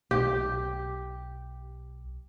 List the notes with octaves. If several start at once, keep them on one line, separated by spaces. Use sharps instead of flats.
B1 G4